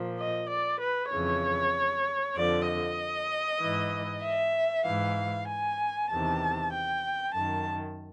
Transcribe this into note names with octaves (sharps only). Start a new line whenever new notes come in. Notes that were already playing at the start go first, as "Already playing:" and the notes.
Already playing: A#2 F3
D#5
D5
B4
F2 C#3 E3 C#5
F2 D3 F3 D5
D#5
G#2 E3
E5
G#2 E3 F5
G#5
E2 C3 D#3 A5
G5
F#2 D#3 A5